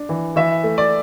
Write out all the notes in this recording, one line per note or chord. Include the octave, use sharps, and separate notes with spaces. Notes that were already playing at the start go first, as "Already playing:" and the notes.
Already playing: D4
E3
E3 E5
A3
D5